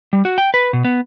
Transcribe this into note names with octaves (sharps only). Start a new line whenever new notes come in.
G3
F#4
G5
B4
B2
B3